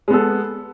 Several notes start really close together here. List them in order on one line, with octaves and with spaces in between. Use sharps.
G#3 B3 A4